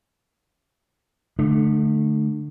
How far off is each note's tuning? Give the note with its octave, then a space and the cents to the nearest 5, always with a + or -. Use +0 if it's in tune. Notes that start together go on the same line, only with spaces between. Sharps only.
D3 +0 A3 -20 D4 +40